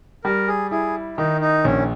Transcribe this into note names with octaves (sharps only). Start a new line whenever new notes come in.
G3 A#4
G#4
E4 G#4
D#3 D#4
D#4
A#1 C#4